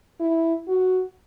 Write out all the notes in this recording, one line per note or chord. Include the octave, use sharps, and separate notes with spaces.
E4
F#4